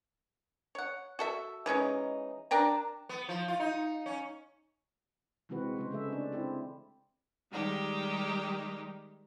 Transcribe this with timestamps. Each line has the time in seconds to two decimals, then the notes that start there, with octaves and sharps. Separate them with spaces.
0.75 C#5 F#5
1.19 F#4 A4 E5
1.66 E3 G#3 C#4 D#4
2.51 D4 A#4 G5 A#5
3.09 B3
3.29 F3
3.48 F4
3.60 D#4
4.06 C#4
5.49 C3 E3 G#3 C4 F#4 B4
5.76 C#3 G#3 C5
5.91 C#3 A3 G#4 E5
6.13 D4
6.32 C4 E4 G4
7.52 D#3 G3 G#3 D#4 G4